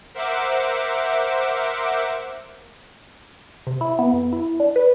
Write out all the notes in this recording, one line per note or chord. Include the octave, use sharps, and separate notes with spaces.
A#4 C5 E5 F#5 D6
C3
E4
B3
F2
E4
D4
B4